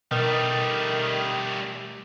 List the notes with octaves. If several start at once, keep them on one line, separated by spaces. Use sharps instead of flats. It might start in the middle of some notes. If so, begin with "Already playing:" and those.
B2 D#3 G3 A3